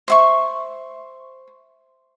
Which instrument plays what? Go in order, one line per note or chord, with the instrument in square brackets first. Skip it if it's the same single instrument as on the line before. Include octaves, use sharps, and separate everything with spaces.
[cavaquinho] C5 E5 C#6